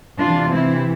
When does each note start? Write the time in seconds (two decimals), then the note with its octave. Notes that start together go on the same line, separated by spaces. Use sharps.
0.20 C3 E3 D4 F4
0.54 C4 E4